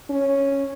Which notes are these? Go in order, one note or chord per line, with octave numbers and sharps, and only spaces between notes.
C#4